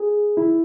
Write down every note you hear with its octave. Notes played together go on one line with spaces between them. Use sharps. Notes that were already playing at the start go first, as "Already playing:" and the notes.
Already playing: G#4
E4